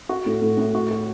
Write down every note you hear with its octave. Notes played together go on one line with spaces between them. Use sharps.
F#4
A2
A2
A2
F#4
F#4